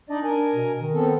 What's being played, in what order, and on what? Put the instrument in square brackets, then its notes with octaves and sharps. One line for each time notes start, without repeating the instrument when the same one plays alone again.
[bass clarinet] D4 [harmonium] D#4 D5 D#5
[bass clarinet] D4 [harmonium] A#4 G#5
[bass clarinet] B2
D#3
[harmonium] B3 C4 A4